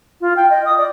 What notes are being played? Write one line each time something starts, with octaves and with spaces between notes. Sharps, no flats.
F4
G5
D#5
D#6
D5